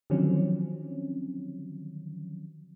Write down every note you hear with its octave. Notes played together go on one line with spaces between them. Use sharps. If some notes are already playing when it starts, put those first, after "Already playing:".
D3 D#3 F3 F#3 C4 C#4